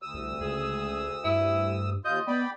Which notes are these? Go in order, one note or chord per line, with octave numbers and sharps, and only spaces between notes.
D2 D#6 E6
C2
C#2 G#4
G2 E4
D#2 F4 D#5 G6
B3 D5 G5 B5